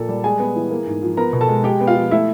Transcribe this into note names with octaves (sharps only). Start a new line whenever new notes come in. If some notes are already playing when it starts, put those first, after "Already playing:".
Already playing: A#2 F3 A#3 A4 A5
G3
G#3 G#4 G#5
B3
E3
A#3
G#2
F3
B3 A#4 A#5
B2
A4 A5
G#3
G#3 G4 G5
B3
F4 F5
F3
A3 E4 E5